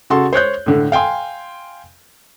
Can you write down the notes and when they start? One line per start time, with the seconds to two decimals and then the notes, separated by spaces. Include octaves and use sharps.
0.10 C#3 F#4 A4 C6
0.33 C5 C#5 F#6 G6
0.66 A2 D3
0.92 F5 G5 G#5 C6